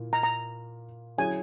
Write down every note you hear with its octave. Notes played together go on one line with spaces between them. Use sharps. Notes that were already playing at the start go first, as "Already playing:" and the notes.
Already playing: A#2 A#3 E4
A#5
A#5
F#3 C#4 E4 G#4 G#5